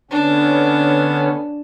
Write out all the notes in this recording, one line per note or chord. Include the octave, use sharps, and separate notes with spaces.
D3 B3 C#4 D4